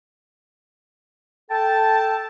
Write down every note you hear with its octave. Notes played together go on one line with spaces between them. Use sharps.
A4 G5 A5